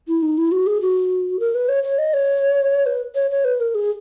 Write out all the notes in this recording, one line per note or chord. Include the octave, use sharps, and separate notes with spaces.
E4
D#4
E4
F#4
G#4
F#4
A#4
B4
C#5
C#5
D#5
C#5
B4
C#5
C#5
B4
A#4
G#4